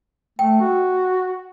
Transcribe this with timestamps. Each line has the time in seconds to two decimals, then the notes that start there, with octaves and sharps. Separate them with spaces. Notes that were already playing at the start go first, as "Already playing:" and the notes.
0.39 A3 G5
0.61 F#4